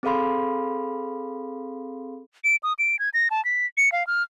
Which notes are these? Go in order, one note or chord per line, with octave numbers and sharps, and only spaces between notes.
C4 G#4 A4 F5 B5 C6
D7
D#6
D7
G#6
A#6
A5
B6
C#7
F5
F6